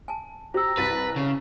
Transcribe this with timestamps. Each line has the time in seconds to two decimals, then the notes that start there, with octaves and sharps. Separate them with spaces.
0.08 G#5 A5
0.54 G4 C5 A#5 E6
0.77 C2 B4 A6
1.16 C#3